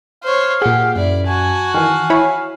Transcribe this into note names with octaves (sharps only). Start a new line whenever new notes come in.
C5 C#5 F5
A#2 G4 G#4 F#5
F#2 E4 D5
F#4 G#5 A5
D#3 E3 F5 G#5
E4 C#5 B5